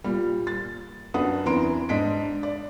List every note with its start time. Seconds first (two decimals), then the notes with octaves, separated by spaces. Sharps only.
0.04 A#2 G3
0.47 A6
1.14 F#2 D4 B4 F#5 D#6
1.45 E2 E3 C4 A#5 C6 D7
1.89 G#2 D4 D#5 B6 D7
2.43 D5